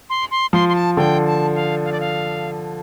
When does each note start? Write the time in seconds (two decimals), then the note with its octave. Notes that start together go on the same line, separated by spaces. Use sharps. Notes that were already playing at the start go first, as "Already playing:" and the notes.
0.10 C6
0.31 C6
0.53 F3 C6
0.69 C6
0.75 A5
0.97 D3 G5
1.26 A5
1.55 F5
1.85 F5
1.92 D5
2.00 F5